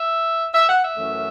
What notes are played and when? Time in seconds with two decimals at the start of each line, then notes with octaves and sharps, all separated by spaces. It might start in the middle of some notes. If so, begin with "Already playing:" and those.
Already playing: E5
0.54 E5
0.69 F#5
0.83 E5
0.97 F#2 E3 A3 C#4